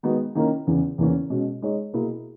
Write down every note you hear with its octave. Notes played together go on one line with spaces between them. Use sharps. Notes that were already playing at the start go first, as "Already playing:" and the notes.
D#3 G#3 B3 D#4 F#4
D#3 A#3 C#4 E4 A#4
E2 C#3 E3
E2 C#3 E3 A#3 C#4
B2 G#3 C#4
G#3 D#4 G#4 C#5
B2 A#3 E4 G#4